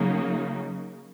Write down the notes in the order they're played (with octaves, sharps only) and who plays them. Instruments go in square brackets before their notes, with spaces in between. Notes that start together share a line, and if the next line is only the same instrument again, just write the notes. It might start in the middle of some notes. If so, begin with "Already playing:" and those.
Already playing: [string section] C#3 F#3 A#3 D#4